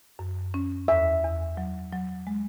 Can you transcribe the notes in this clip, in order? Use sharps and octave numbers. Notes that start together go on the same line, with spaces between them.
F#2
C#4
E2 E5
E2
F#3
F#3
G#3